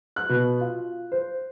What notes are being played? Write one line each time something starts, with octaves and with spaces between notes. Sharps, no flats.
F#6
B2
F4
C5